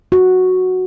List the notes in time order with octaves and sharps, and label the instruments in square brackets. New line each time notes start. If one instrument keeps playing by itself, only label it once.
[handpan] F#4